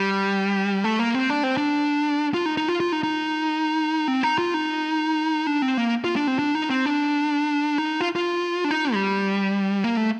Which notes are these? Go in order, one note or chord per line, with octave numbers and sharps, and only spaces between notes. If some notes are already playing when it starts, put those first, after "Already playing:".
Already playing: G3
A3
A#3
C4
D4
C4
D4
F4
D#4
D#4
F4
F4
D#4
D#4
C4
D#4
F4
D#4
D4
C4
A#3
F4
D4
C4
D4
D#4
C4
D4
D#4
F4
F4
D4
D#4
G3
A#3
A3